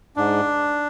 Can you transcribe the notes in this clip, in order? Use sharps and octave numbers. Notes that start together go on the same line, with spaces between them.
G#2 D4